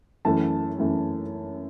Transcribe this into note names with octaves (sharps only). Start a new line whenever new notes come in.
F#2 E3 A3 A5
F#2 E3 A3